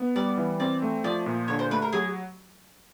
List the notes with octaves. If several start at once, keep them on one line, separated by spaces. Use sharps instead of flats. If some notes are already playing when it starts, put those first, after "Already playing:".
Already playing: B3
G3 D5
E3
C4 D5
A3
F3 D5
A#2
D3 C#5
C5
A3 B4
A#4
F#3 G#4